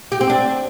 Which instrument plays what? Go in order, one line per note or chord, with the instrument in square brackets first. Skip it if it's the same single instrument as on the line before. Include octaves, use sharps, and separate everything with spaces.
[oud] G4
C4
D4